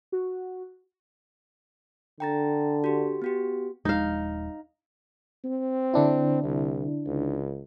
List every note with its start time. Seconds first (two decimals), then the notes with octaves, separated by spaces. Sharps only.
0.12 F#4
2.20 D3 G5 A#5 A6
2.84 F#4 G4
3.22 B3 F#4 G4
3.85 D#1 F3 G#3 D#4 F5
5.44 C4
5.94 D3 D4 E4
6.43 C2
7.06 C#2